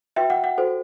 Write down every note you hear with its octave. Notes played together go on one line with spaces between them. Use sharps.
F#4 B4 E5 G5
F#5
F#5
F#4 A4 C5